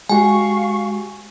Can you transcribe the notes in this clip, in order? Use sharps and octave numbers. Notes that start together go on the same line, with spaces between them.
G#3 F#4 G4 F5 G#5 C#6